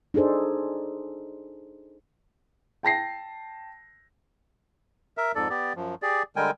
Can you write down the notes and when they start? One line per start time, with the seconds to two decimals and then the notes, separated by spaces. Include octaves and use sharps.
0.14 D4 D#4 G#4 A4 C5
2.83 G5 A5 A#6 C7
5.17 A#4 E5
5.35 F2 G#2 A4 D5
5.50 B3 G4 D5
5.76 F#2 F3
6.02 G4 G#4 D5
6.36 D3 G3 G#3 A#4 G5 G#5